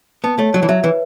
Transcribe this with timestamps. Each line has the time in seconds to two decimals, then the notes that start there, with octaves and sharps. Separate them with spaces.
0.24 B3 A5
0.38 A3 C#5
0.54 F#3 C#5
0.63 E3
0.69 F#3 E5
0.84 E3 B4